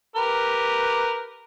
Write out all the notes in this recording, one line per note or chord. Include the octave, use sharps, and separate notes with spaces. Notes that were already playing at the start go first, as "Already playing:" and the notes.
G4 A#4 B4